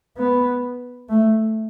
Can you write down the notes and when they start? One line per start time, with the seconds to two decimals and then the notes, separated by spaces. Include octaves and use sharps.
0.18 B3
1.09 A3